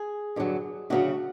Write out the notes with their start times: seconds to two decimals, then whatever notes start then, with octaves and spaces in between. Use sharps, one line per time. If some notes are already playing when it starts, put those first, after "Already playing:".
Already playing: G#4
0.36 G2 D3 F#3
0.90 D2 C#3 F#3 F#4